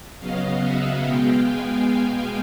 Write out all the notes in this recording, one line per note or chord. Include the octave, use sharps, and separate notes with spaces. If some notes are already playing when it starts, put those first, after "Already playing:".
C#3 F#3 B3 D#5 F5
E5 F#5
B2 G#3 B3 F5 G5
G#5